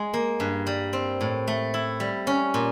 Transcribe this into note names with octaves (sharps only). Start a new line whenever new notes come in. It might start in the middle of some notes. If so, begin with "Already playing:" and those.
Already playing: G#3
A#3
G2
G3
C4
A2
A3
E4
G3
C#4
A#2